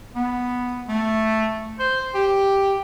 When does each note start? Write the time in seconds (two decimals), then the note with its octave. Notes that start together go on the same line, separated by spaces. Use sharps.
0.16 B3
0.89 A3
1.79 C5
2.15 G4